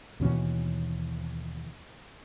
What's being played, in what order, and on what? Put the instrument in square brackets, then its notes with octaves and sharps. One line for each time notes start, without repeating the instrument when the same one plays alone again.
[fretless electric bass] D#2 B2 E3 C#4